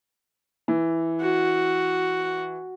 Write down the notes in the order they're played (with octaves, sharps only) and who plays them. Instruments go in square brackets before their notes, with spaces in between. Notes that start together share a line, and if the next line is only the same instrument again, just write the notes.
[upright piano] E3
[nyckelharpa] F#4